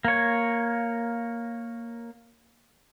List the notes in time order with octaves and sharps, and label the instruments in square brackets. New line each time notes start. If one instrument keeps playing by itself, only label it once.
[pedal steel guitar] A#3 C#5